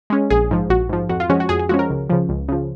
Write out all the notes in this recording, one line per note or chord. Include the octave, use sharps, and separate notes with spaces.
G#3 C#4
A#1 G#4
G#2 F3
A#1 F#4
G#2 F3
F2 F#4
F4
F3 G#3 C#4 F#4
F#4
F2 G#4
G#4
F3 G#3 C#4 F#4
A#4
C#2
C#3 F3
C#2
C#3 F3